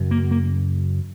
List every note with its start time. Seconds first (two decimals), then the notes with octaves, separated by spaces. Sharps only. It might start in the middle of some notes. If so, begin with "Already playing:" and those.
Already playing: F#2 C#3
0.11 A#3
0.31 A#3